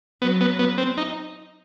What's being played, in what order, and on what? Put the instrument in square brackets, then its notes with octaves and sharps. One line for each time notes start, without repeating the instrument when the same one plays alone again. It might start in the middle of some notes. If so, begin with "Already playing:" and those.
[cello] F#3 [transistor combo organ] B3
[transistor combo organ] B3
B3
C4
D#4